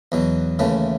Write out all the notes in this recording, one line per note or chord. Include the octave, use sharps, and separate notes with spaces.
E2 B2 F#3
D#2 C#3 E3 A3